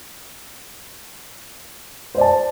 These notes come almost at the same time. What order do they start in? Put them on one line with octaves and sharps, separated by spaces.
C5 D5 A5